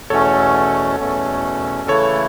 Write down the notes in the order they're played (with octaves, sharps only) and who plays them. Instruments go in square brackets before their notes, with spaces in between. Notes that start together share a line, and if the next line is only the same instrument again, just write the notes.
[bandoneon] E2 B2 A3 C#4 [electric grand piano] A4 C#5
[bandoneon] E2 B2 A3 C#4
[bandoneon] C#3 E3 A3 E4 [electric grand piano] A4 C#5